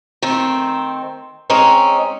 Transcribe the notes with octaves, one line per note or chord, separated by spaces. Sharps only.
D#3 A3 C4
G#3 C4 C#4 D#4